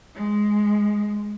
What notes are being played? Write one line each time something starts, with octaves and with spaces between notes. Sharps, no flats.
G#3